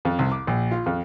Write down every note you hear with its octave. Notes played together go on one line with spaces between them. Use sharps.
F2
C2
D6
A#1
F4
F2